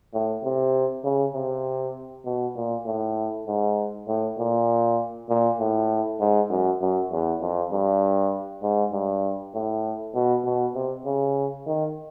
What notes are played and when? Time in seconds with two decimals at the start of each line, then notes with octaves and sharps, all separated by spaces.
0.14 A2
0.44 C3
1.04 C#3
1.35 C3
2.26 B2
2.56 A#2
2.86 A2
3.47 G#2
4.08 A2
4.39 A#2
5.29 A#2
5.60 A2
6.20 G#2
6.50 F#2
6.81 F#2
7.12 E2
7.42 F2
7.72 G2
8.63 G#2
8.93 G2
9.54 A2
10.15 B2
10.45 B2
10.75 C3
11.06 C#3
11.67 D#3